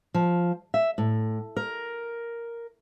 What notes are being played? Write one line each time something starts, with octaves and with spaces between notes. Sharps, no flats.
F3
E5
A2
A#4